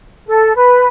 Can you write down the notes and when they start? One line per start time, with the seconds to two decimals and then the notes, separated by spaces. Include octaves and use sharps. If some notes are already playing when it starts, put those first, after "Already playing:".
0.25 A4
0.55 B4